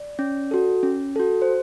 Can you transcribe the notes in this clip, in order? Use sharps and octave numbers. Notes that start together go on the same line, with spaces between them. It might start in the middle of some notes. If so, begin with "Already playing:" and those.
Already playing: D5
C#4
F#4 A4
C#4
F#4 A4
C5